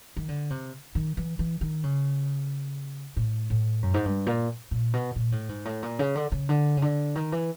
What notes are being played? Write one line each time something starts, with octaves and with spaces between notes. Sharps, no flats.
D#3
D3
C3
D#3
E3
E3
D#3
C#3
A2
A2
F#2
G#2
G2
A#2
A#2
B2
A#2
A2
G#2
A2
A#2
C#3
D3
C#3
D3
C#3
D3
D#3
E3